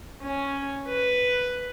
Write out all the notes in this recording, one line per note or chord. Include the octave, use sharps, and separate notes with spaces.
C#4
B4